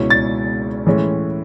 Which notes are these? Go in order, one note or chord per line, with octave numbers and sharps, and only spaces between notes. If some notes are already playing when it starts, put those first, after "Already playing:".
Already playing: C#2 B2 G#3 C#4 E4
A6
A2 E3 G#3 C#4